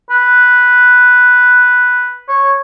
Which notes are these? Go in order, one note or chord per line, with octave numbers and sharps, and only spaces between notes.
B4
C#5